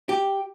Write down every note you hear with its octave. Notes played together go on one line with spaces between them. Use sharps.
G4